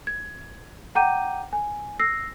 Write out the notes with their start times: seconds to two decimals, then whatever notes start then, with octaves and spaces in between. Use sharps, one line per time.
0.07 G#6
0.95 F#5 G5 A#5 D6 G6 D#7
1.53 G#5
1.99 E6 A#6 C7